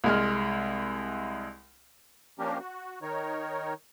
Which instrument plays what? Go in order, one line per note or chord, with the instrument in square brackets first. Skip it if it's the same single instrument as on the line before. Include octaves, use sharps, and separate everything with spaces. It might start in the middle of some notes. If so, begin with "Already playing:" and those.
[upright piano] C2 G#3 F6
[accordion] F3 A#3 C#4 D4 G4 A#4
F#4
D#3 D#4 A#4 C#5